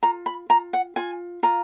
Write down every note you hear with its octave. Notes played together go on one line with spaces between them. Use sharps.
F4 A#5
B5
F4 A#5
F#5
F4 G#5
F4 A#5